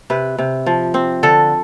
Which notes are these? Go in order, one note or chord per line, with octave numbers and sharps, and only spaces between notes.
C3 B4
C3
F3
C4
D3 A4